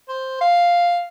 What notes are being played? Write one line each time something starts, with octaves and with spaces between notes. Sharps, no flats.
C5
F5